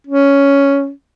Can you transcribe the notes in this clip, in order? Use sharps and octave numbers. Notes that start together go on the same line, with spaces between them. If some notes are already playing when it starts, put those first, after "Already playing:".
C#4